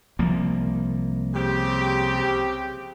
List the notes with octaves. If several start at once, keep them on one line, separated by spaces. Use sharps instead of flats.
C2 F3 A#3
C#3 C4 G4